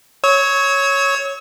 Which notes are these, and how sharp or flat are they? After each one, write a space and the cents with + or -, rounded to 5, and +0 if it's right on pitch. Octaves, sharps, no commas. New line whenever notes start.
C#5 +0 E6 -40